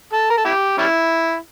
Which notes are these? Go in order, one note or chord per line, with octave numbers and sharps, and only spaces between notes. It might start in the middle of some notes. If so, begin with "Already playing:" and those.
A4
A#4
A4
E4 G4
G3 C#4 E4